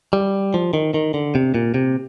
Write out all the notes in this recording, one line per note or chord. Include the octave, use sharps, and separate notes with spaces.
G3
F3
D#3
D#3
D3
C3
A#2
C3